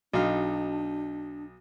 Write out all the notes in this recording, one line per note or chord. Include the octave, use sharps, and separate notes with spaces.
B1 D4 D#4 F#4 F5